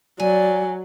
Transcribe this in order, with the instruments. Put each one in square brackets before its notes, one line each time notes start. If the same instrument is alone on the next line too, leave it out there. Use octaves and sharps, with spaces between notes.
[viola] F#3 [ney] D5 [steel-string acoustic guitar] G#5